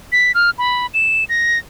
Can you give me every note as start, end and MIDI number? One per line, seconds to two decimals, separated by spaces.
0.12 0.32 95
0.35 0.50 89
0.58 0.87 83
0.94 1.24 100
1.29 1.59 94